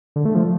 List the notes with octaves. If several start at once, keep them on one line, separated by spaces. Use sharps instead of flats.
D3
A3
F3